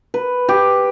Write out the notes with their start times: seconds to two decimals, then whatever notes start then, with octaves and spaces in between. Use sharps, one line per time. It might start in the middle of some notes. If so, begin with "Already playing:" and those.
0.14 B4
0.49 G4